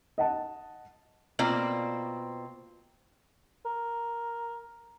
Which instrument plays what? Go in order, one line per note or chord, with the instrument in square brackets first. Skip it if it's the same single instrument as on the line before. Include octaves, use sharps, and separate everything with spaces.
[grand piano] D#5 F#5 A5
[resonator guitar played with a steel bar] B2 A#3 C4 F4 D5
[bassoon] A#4